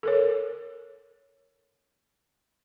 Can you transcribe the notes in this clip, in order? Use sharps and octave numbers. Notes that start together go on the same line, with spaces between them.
A4 A#4 C#5